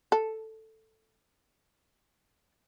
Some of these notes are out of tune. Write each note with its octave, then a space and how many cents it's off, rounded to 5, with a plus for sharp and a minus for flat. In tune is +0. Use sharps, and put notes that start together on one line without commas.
A4 +5